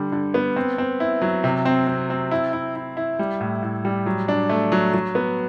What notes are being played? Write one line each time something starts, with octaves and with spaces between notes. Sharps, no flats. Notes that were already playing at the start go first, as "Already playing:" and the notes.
Already playing: D3 G3
D3
B3
C4
C4
E4
F#3
C3
C4
C4
C4
E4
E4
E4
E4
G3
A2
A2
G3
F#3
D4
A3
F#3
F#3
B3